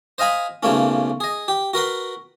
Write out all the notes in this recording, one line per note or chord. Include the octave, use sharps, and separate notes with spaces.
C5 D#5 F5 G#5 B5
B1 C#3 A3 A#3 C#4
G#4 D#5
G4
F#4 A#4 B4 C6